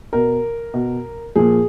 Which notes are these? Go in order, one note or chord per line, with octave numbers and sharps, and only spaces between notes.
B2 A#4
B2
A#2 F3 G#4